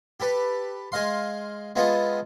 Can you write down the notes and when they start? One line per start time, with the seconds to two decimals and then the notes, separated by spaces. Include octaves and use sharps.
0.20 G4 A4 B4
0.92 G#3 D#5 F5 C6
1.76 G#3 B3 F4 A4 D#5